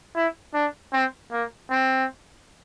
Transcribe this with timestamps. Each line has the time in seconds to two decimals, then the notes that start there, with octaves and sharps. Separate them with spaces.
0.16 E4
0.54 D4
0.93 C4
1.32 A#3
1.71 C4